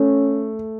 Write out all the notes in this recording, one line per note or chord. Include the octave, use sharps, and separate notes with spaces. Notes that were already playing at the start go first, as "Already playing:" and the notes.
Already playing: A3 C#4